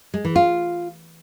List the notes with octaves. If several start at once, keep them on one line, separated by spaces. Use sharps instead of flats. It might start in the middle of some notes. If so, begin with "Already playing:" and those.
G#3
E3
F4